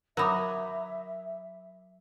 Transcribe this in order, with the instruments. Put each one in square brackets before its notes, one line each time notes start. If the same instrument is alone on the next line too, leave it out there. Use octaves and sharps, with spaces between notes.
[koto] F#3 D#4 [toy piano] A#4 B5 D6 [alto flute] E5